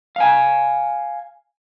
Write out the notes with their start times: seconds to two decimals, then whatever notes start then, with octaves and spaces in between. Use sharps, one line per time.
0.16 F5 G#5